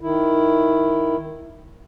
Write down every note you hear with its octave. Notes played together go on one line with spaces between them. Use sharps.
D#3 E4